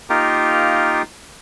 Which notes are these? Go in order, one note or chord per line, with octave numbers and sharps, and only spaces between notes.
A#3 D#4 F4 G4 A#4